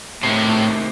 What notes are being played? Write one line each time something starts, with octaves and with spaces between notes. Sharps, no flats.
A2 C3 D#3 A3